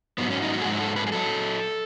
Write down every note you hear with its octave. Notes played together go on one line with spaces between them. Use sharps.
G#2 F#3 B3
C#4
D#4
F#4
G#4
G#2 F#3 F#4
A4
B4
G#4
F#3 A4